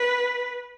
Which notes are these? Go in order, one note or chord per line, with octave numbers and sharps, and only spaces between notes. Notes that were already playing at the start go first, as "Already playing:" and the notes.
Already playing: B4